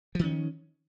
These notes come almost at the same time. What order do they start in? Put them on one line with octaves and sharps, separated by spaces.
F3 D#3 C#4